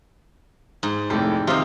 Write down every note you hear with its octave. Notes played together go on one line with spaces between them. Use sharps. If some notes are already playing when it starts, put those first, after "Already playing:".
G#2
F1 A2 G4
C3 D#3 D#4 F4 C5